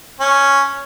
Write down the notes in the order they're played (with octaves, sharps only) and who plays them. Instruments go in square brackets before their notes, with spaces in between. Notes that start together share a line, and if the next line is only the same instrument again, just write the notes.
[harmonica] C#4